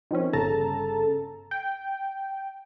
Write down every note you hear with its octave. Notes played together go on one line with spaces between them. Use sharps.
D#3 F3 C4 C#4
G1 C#3 A4 A5 A#5
G5